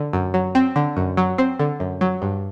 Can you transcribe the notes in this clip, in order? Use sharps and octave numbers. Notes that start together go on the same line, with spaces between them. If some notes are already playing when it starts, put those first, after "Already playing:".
Already playing: D3
F#2
F#3
C4
D3
F#2
F#3
C4
D3
F#2
F#3
G2